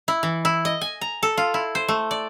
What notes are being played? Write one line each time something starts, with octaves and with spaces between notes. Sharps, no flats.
E4
E3
E4
D#5
G#5
A#5
A4
F4
E4
C5
A3
D5